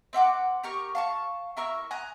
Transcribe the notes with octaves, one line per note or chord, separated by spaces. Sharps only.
C4 E5 F#5 D6
G4 A#4 C#6
F5 A5 C#6
E4 A#4 C#6 E6
G#5 A#5 D#6 F#6